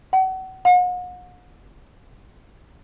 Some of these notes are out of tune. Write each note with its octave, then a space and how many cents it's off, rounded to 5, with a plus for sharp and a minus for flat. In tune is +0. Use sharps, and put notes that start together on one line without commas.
F#5 +35
F#5 -40